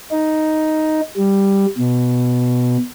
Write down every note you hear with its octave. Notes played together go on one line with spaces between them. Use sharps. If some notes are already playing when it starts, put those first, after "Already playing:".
D#4
G3
B2